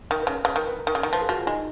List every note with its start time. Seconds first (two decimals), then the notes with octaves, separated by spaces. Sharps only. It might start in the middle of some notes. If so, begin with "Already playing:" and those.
0.10 D#3 A#4
0.22 B4
0.27 C#3
0.33 A#4
0.45 C#3 B4
0.55 D#3 A#4
0.67 B4
0.79 A#4
0.87 D#3
0.95 C#3
1.03 D#3
1.07 A#4
1.13 F3 B4
1.21 G#4
1.29 F3 F#4
1.38 F4
1.46 G#3 D#4